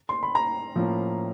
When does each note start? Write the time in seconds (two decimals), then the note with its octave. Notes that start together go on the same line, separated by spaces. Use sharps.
0.09 C6
0.23 B5
0.35 A#5
0.75 A2 F3 A#3 C#4